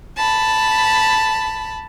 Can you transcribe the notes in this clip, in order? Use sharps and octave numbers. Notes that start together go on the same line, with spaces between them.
A5 B5